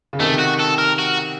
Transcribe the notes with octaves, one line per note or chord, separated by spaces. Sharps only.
C#3
C3 D#3 A3
F#4
A4
A#4
F#4